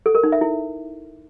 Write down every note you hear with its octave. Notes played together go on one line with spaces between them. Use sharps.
A4
A#4
D#4
E5
E4